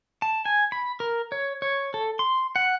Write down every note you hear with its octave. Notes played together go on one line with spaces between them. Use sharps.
A5
G#5
B5
A#4
C#5
C#5
A4
C6
F#5